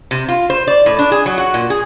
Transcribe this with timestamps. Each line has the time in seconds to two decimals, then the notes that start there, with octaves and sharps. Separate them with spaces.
0.11 C3
0.28 F4
0.50 C5
0.67 D5
0.86 A2
0.99 D4
1.12 G#4
1.26 F#3
1.38 F#4
1.54 A#2
1.70 G#4